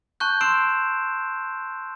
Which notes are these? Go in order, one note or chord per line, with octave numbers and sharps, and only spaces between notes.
A5 C#6 F#6 G6
C6 E6 C7 D7 E7